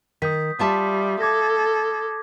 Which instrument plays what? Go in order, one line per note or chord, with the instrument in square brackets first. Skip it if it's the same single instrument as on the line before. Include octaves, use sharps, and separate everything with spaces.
[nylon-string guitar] D#3 [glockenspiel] D#6 G6 B6
[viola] G3 [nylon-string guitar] F4 E5 A5
[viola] A4 [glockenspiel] D6 G#6 A#6